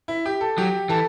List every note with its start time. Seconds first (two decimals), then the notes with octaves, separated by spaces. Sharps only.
0.08 E4
0.26 G4
0.41 A4
0.58 F#3 G4
0.89 E3 A4